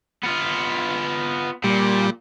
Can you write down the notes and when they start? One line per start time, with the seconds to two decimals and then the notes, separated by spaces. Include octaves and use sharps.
0.23 B3 F4
1.64 A#2 G3